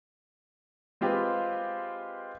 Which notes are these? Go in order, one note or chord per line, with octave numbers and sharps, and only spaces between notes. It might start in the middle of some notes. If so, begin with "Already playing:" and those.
G#3 C4 F4 G4 B4